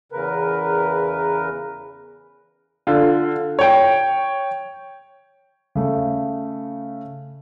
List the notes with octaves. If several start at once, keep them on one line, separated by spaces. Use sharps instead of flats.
E2 C#3 A#4 B4
D3 F4
C#5 G5
C#3 A3